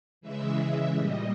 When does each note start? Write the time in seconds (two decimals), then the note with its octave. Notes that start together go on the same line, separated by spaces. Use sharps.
0.21 C#3 E3 G#3 E5
0.93 A#2 G3 D#5